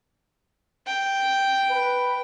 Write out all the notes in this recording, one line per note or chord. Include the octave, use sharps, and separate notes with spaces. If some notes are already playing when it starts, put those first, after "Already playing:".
G5
B4